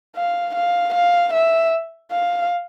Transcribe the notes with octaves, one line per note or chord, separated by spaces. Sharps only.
F5
F5
F5
E5
F5